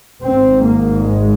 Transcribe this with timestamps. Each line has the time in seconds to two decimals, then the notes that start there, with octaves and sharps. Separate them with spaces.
0.23 G#1 G#2 C4
0.64 A#3
1.04 G#3